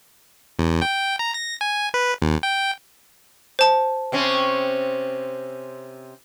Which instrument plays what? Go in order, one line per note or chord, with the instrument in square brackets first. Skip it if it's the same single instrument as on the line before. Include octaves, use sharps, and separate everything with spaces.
[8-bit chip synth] E2
G5
A#5
A#6
G#5
B4
D#2
G5
[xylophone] C5 A5
[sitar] C3 C4 C#4